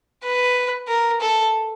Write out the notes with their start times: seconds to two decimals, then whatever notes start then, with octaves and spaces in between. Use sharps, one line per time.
0.23 B4
0.88 A#4
1.21 A4